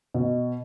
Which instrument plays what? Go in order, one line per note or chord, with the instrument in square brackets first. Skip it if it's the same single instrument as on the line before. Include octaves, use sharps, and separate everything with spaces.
[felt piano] B2